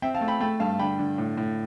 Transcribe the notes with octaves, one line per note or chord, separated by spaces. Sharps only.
C4 E5 G5
F5 A5
A3
G5 B5
A3 G5 B5
G2 F5 A5
D3 G5 B5
D3
A2
A2